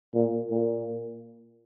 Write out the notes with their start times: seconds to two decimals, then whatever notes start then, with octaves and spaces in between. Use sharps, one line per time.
0.14 A#2
0.50 A#2